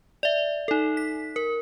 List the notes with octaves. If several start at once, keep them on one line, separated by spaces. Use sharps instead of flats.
D5 E5
D#4 A4
B6
A#4